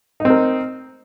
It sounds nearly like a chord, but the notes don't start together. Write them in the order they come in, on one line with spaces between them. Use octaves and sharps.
D#4 C4 A#4